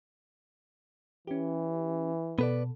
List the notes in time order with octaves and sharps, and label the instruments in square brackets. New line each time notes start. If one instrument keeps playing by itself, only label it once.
[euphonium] E3 [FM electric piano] C#4 G4
[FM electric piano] B2 A4 [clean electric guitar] B3 B4 D5